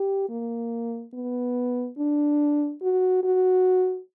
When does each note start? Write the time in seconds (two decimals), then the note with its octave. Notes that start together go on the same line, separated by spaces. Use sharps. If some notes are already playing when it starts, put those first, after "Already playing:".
Already playing: G4
0.29 A#3
1.14 B3
1.98 D4
2.82 F#4
3.24 F#4